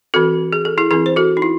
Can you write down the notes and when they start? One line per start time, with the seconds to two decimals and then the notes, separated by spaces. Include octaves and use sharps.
0.14 E3 C4 F#4 A4
0.53 G#4
0.65 A4
0.78 E4 G#4
0.91 E3 C4 E4 G#4
1.06 C5
1.16 F#4 A4
1.37 D#4
1.42 E4